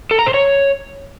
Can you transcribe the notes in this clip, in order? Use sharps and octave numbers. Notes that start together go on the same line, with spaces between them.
A4
A#5
C5
C#5